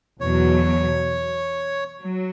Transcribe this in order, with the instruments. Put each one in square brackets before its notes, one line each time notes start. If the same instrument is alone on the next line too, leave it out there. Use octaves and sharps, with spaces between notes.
[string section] E2 B2 F#3 [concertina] C#5
[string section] F#3